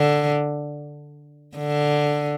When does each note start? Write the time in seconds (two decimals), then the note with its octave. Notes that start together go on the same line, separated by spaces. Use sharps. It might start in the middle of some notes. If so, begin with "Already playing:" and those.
Already playing: D3
1.57 D3